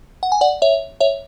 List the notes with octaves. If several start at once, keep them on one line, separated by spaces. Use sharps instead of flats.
F#5
G#5
D5 F#5
C#5 E5
C#5 E5